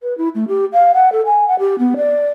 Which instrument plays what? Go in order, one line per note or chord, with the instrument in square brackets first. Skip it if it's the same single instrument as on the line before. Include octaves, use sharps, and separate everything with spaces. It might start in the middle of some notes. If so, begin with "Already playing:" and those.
[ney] B4
E4
A3
G4
F5
F#5
A4
G#5
F#5
G4
B3
D5